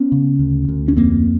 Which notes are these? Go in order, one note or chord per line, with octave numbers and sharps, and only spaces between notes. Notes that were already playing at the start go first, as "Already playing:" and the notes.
Already playing: B3 C#4
C#3
D2
D2
C#4
F2 A#3 C4